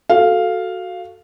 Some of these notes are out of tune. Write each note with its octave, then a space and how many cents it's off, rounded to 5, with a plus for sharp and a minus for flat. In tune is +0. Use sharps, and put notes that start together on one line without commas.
F#4 +0 A4 +0 F5 +0